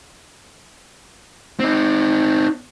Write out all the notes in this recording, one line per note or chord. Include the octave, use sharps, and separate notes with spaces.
C4 D#4